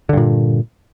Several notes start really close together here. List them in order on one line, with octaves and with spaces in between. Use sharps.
D3 G2 A#2